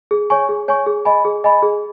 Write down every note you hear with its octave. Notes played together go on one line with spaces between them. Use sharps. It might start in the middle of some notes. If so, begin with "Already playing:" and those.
G#4
C#5 G#5 C#6
G#4
C#5 G#5 C#6
G#4
D#5 G#5 B5
G#4
D#5 G#5 B5
G#4